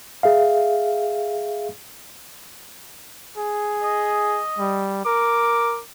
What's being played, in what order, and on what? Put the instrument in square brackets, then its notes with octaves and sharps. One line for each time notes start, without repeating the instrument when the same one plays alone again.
[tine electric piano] G#4 E5 F5
[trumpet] G#4
[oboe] D#5
[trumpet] G3
[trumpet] A#4 [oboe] D6